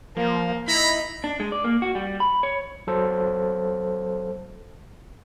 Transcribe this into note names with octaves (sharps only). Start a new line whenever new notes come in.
F3 A#3
D#4 E4 A#5 B5
D4
G#3
D5
A#3
F#4
G3
B5
C#5
F#3 A4 C5